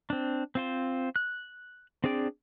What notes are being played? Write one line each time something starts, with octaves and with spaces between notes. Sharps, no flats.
C4 D4
C4 F4 C5
F#6
C4 D4 G#4 D5 G5